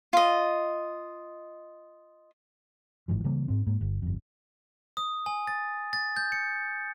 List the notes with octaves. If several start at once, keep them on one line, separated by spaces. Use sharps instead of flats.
F4 D#5
G1 G#2 E3 F3
C#3 E3 G3 A#3
G#2 C4
G#2 A#3
G1
G1 F2
D#6
G#5
A6
A6
G6
C#7